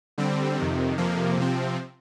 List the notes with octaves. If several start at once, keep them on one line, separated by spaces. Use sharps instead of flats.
D3 G3 C4
F2 C3 D#3
F2 C3 F3 A#3
C3 F3 C4